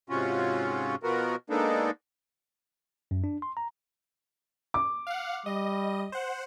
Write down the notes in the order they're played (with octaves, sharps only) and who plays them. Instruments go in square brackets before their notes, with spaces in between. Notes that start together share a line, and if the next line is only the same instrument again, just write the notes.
[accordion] G#2 C3 C#4 F4 F#4
B2 F3 B3 F#4 A#4
G#3 A#3 B3 D4 D#4 A4
[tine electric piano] F#2
D4
C6
A#5
[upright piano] D6
[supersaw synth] F5 F#5
[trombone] G3 [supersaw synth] D#5
[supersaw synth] C5 F#5